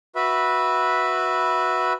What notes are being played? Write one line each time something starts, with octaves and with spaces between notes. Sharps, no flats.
F#4 B4 E5 B5